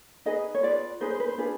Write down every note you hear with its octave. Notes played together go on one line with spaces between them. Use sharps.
D#4 G#4 B4 D#5
C#5
F4 G#4 B4 D5
D#4 G#4 B4 C5
C5
B4
C5
D4 F4 G#4 B4